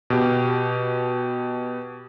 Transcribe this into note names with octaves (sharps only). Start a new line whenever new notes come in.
B2 G4